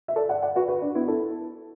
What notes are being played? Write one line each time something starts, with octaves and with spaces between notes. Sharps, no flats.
E5
A4 D5
D5 F#5
D5 F#5
F#4 B4
F#4 B4
D4
B3 E4
E4 A4